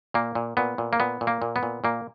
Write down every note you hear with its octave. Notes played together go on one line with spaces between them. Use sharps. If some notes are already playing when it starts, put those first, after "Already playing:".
A#2 A#3
A#2
A#2 B3
A#2
A#3
A#2 B3
A#2
A#3
A#2
B3
A#2
A#2 A#3